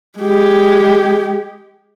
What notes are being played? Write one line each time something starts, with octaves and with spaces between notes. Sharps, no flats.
G#3 G4